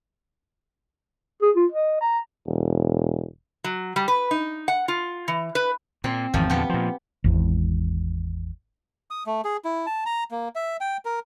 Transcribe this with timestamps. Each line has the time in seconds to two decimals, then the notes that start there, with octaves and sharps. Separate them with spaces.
1.42 G#4
1.56 F4
1.72 D#5
2.01 A#5
2.47 E1
3.64 F#3
3.96 G3
4.08 B4
4.31 D#4
4.68 F#5
4.88 F4
5.28 E3
5.55 B4
6.04 A#2 C4
6.34 G#1 E2 D#3 F3
6.50 E2 A#2 D3 B3 G4
6.69 A#2 F3
7.24 G#1 E2 G#2
9.11 D#6
9.26 A3
9.45 G#4
9.65 E4
9.86 A5
10.06 A#5
10.31 A#3
10.55 E5
10.81 G5
11.05 A#4